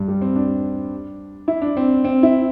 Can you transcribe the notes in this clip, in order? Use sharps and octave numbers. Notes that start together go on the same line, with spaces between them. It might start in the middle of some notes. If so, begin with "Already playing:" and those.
Already playing: G2
G3
C4
D4
E4
D4
C4
C4
E4